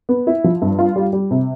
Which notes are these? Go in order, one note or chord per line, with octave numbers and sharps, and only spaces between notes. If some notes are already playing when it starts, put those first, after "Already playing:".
B3
E4
F3
G2
F4
G3
G3
C3